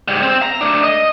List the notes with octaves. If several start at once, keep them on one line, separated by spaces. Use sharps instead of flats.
G#2 G3
C4
A#5
A3 D4
D#5